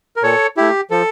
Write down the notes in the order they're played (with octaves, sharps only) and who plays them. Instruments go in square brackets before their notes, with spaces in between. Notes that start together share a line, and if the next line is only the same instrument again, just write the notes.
[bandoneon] A#4
A#2 A4 C#5
A3 E4 G4
F3 A4